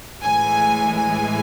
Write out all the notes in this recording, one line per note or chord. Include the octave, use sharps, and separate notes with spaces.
A2 E3 G#3 G#5
G#5